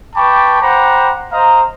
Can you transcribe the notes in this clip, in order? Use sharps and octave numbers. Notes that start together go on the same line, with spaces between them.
B4 G5 A5 B5 C#6 D6
C5 F#5 G5 A#5 B5 D6
C5 D#5 F5 A#5